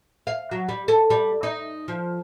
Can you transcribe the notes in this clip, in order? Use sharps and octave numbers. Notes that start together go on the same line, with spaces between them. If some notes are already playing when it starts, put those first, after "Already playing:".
F5
F#3
G3
A4
G3
D#4
F3